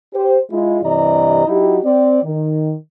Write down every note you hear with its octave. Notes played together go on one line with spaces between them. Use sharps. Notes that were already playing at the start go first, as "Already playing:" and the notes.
G4 C5
G#3 E4 F4
G2 C3 E3 D5 D#5 A#5
F#3 D#4 E4 F#4 G4
C4 D5
D#3